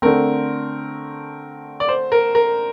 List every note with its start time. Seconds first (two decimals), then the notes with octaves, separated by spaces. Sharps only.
0.02 D3 A3 C4 A#4
1.80 D5
1.89 C5
2.12 A#4
2.35 A#4